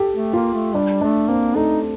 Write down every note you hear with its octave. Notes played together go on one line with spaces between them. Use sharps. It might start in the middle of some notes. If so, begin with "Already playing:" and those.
Already playing: G4 A4
A3
A#3 F4
A3
G3 D4
A3 D4
A#3 C4
A3 D#4